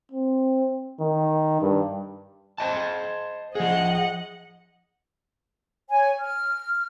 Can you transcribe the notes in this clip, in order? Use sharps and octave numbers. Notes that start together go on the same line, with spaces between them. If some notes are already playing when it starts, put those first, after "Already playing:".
C4
D#3
G2
C5 D#5 A5
F3 G#4 D#5 F#5
C#5 G#5
F6